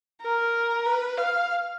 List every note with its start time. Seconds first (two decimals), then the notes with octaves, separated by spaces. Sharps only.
0.22 A#4
0.86 B4
1.18 F5